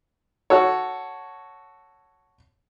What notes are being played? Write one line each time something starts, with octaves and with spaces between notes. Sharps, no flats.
F#4 A4 C#5